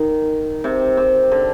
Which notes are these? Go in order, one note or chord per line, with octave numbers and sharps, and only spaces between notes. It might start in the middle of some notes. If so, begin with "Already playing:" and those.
Already playing: D#3
C3
C3
D3